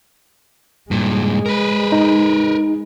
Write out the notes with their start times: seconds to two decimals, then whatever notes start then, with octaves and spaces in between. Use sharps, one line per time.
0.91 G2 A#2 G#3
1.46 A#4 B4
1.92 D#4